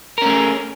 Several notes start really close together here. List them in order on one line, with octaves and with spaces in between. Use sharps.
A#4 C#4 A3 G#4